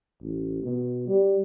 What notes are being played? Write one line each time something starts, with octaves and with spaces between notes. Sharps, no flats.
A1
B2
G3